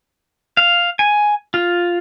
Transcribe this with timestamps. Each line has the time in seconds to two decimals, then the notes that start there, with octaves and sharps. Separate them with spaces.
0.57 F5
0.99 G#5
1.54 F4